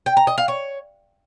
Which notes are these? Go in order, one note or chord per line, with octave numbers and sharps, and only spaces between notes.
G5
A#5
D#5
F5
C#5